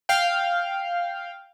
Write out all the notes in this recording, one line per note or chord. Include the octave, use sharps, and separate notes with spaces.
F5 G5